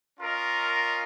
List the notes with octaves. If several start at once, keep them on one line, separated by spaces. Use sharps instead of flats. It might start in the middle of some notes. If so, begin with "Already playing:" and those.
C#4 F4 A#4 D#5